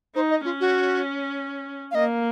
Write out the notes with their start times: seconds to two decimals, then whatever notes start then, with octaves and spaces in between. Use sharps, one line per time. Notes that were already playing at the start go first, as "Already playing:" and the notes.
0.15 D#4 C5
0.30 D#5
0.45 C#4 F4
0.61 F#4
1.91 F5
1.95 A#3 D#5